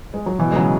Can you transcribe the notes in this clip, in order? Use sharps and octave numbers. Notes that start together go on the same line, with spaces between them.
G#3
F#3
B2 E3
G#3
C#3 F#3